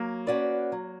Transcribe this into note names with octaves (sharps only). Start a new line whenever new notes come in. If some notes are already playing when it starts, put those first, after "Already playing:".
Already playing: F#3 A#3
C#4 F#4 B4 D5
F#3